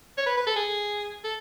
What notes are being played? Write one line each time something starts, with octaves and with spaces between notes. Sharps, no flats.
C#5
B4
B4
A4
G#4
A4